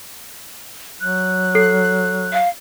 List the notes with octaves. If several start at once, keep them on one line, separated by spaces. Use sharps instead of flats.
F#3 F#6
A4 C7
F5